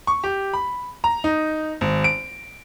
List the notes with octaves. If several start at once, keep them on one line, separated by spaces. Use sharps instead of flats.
C#6
G4
B5
A#5
D#4
G#1
D7